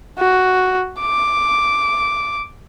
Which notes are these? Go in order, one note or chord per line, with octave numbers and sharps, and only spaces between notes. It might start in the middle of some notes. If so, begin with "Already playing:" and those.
F#4
D6